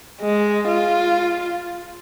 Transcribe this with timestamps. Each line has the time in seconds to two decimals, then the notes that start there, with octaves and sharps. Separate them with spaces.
0.21 G#3
0.68 F4